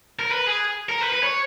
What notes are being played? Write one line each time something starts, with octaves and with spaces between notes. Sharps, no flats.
A#4
B4
G#4
A#4
B4
B4
C#5